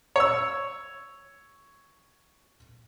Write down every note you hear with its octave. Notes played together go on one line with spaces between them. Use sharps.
C#5 E6